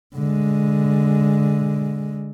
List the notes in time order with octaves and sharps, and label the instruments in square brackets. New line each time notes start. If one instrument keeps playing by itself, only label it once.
[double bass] D3 G#3